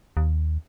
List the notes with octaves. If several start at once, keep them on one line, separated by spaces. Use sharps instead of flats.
D#2